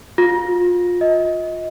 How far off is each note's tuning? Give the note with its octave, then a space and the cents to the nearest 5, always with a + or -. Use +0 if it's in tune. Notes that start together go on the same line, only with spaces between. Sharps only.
F4 +25
D#5 +25